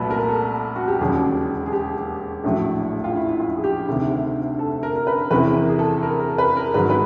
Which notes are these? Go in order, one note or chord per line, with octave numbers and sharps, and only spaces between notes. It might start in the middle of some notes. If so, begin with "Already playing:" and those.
Already playing: C2 A#2 F#3 A3 A4 B4
A#4
A4
F#4
G4
E1 D#2 C#3 F#3 G#4
G#4
G4
A#1 A2 F#3 A3
F4
E4
F4
G#4
G4
D2 C3 D#3
A4
A#4
A#4
B4
E2 C3 E3 B4
A#4
G#4
A4
A#4
A#4
B4
A#4
G#1 G#2 D#3 F#3 B4
B4